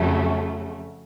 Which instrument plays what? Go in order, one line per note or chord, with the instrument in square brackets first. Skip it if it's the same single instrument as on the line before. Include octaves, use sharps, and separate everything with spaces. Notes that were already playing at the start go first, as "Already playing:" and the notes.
Already playing: [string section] F2 C#3 F#3 A3